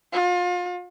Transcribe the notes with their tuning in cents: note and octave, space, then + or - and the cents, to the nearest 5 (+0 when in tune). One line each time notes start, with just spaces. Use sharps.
F4 +35